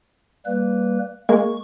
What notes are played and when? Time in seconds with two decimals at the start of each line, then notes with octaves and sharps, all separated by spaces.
0.46 G3 A#3 B4
1.29 G#3 A#3 C#6